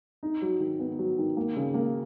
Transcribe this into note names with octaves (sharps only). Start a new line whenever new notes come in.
D#4
F#3
D#3
B3
F#3
D#3
A#3
C#3
A#3